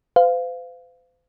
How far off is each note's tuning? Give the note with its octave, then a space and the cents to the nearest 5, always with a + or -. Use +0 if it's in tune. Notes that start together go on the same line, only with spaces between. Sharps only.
C5 -45 F5 +0